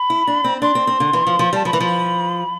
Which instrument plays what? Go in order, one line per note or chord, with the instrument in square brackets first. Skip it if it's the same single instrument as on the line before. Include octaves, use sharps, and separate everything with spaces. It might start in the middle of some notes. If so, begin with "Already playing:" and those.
Already playing: [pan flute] B5
[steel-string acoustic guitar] E4
D4
C4
[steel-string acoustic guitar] D4 [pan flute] C6
[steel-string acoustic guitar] C4
C4
D3
E3
F3
F3
[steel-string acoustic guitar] G3 [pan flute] A5
[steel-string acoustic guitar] F3 [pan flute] B5
[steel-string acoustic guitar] E3
F3